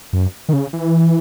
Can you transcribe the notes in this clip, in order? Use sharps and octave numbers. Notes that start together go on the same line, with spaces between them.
F#2
D#3
C#3
E3